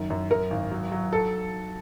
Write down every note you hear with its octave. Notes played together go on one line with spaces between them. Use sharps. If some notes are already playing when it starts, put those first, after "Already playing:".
Already playing: F#2 D#3
F#2
F#2 A#4
G#1
F#3
F#3
A4